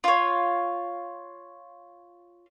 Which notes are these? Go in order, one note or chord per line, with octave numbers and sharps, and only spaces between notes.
F4 C#5